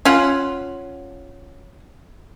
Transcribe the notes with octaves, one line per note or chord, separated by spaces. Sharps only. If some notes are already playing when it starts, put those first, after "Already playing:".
C#4 F4 F#5